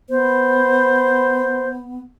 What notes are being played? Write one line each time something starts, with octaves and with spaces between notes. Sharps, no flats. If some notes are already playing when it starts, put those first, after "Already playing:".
B3 C5